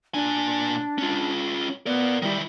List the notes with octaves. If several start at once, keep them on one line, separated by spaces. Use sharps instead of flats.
A#2 D4 G#5
C#4 F4
B3 A#4 D5
D#3 G3 E4